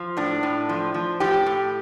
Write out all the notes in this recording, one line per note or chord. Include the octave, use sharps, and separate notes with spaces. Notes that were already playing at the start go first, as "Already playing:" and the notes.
Already playing: F3
A2 D4
A2
F3
F3
A2 G4
A2